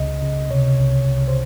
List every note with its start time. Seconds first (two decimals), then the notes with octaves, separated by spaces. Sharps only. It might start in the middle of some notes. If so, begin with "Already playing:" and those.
Already playing: C#2 C#3 D#5
0.22 C#3
0.50 C3 C#5
0.78 C2
1.07 C2
1.28 C5